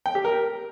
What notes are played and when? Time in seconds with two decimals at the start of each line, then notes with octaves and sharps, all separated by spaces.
0.06 G5
0.15 G4
0.25 A#4